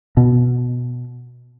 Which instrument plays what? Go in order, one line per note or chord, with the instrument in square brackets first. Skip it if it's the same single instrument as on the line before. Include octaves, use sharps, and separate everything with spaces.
[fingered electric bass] B2